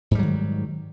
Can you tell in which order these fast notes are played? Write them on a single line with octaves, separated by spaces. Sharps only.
G#2 G3 F#3 D#3